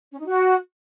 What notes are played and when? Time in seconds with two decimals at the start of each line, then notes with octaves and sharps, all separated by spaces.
0.12 C#4
0.20 D#4
0.27 F#4